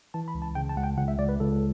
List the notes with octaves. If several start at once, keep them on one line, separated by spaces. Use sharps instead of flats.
E3 A5
B5
C#2
A5
C#3 G5
A5
C#2 F#5
G5
C#2 F#5
E5
C#2 D5
B4
C#2 A4